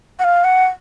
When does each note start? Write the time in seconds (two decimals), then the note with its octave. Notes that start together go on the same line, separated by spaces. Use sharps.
0.19 F#5
0.24 F5
0.44 F#5